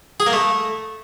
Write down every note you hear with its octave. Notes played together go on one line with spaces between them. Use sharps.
G#4
A#3
A3